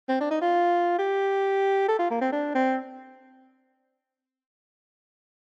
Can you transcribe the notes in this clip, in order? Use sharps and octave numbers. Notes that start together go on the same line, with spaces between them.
C4
D4
D#4
F4
G4
A4
F4
A#3
C4
D4
C4